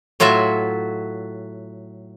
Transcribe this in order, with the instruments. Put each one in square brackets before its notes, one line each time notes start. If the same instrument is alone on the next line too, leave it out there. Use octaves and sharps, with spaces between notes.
[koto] A2 F#3 F4 F#4 E5